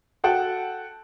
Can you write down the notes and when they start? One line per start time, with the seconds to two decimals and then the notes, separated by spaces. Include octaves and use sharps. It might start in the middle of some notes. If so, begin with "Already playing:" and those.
0.24 F#4 A4 F#5 G5 A5